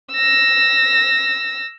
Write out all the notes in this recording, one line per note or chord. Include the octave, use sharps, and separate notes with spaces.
E6 A#6